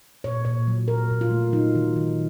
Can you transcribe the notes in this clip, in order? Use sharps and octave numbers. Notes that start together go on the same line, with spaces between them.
A#2 C#5
A#2 C#5
F#3
A#2 A#4
A#2
F4
A3
F#3 D#4
D#3
D#3